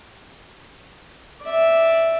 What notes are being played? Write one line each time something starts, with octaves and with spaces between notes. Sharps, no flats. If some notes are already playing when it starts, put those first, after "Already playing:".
D5 E5